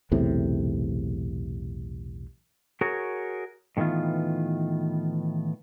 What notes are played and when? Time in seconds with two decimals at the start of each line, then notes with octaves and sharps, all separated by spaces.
0.11 B1 E2 A2 C3
2.81 F#4 G#4 A#4 C#5
3.77 A2 D#3 E3 B3 F4